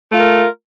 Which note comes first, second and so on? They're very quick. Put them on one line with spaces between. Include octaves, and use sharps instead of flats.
A3 F4 A#4